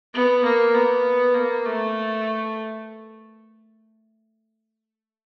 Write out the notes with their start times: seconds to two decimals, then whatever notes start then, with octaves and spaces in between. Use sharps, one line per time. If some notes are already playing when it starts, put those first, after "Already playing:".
0.14 B3
0.44 A#3
0.75 B3
1.34 A#3
1.65 A3